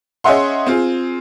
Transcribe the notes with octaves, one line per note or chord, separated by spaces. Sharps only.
C#4 G#4 D#5 E5 F#5 C6
C4 F4 G#4